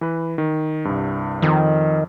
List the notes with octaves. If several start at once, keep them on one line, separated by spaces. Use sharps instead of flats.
E3 B4
D#3
C2 G2
F2 D#3